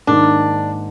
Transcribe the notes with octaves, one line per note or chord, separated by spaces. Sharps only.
G#2 D#3 A#3 D4 D#4